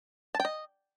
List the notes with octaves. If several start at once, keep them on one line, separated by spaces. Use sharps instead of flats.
A5
G5
D#5